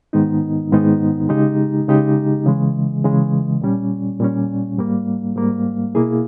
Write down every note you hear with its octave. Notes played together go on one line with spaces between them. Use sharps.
G#2 D#3 G#3 B3 D#4
G#2 D#3 G#3 B3 D#4
C#3 G#3 D#4 G4
C#3 G#3 D#4 G4
C#3 E3 G#3
C#3 E3 G#3
A#2 G3 C#4
A#2 G3 C#4
G#2 G3 A#3
G#2 G3 A#3
B2 A#3 E4 G#4